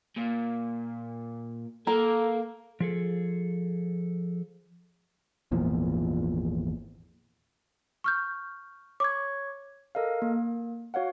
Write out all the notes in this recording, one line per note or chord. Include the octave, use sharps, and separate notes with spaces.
A#2
A#3 A4 A#5
F3 G#4 A4
G#1 E2 A#2 F3
C#6 F6 G6
C#5 C#6 D6 G#6
A4 A#4 D#5 F5
A#3
F#4 C#5 F5 F#5